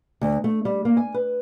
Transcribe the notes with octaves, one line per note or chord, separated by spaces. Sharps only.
D2
A3
G3
A#3
G#5
B4